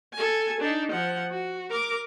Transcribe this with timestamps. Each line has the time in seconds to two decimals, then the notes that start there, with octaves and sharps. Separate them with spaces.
0.13 A4 G#5
0.61 D4 D#4
0.92 F3 F#5
1.31 F#4
1.70 A#4 D6